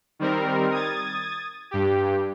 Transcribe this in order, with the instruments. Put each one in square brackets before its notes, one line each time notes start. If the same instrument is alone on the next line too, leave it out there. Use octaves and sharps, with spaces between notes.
[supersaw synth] D#3 G3 C4 A#4
D#6 G#6 A6
G2 G4